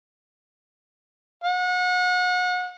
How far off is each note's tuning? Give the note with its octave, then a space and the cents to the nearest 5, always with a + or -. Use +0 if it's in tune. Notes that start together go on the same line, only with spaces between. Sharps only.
F#5 -35